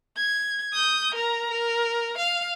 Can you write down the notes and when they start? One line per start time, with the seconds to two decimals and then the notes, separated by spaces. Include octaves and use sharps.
0.17 G#6
0.73 D#6 G6
1.15 A#4 A#5
1.51 A#4
2.18 F5